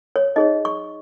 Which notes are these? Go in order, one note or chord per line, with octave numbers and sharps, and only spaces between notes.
C#5
D#4 G#4 C#5 D#5
C#6